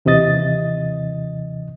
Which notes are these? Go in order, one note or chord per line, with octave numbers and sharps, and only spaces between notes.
D#2 C3 E3 D#5 A6